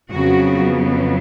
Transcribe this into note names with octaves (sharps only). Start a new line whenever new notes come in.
F2 C#3 F#3 B3 F#4